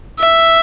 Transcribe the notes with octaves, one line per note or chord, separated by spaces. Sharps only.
E5